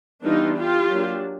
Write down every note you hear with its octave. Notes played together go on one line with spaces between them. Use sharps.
E3 G3 B3 D4 D#4 F4
F4 G4
F#3 A#3 D4